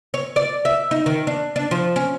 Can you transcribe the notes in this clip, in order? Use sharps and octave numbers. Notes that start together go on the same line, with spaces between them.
C#5
D5
E5
D#4
D#3
D4
D4
F3
C#4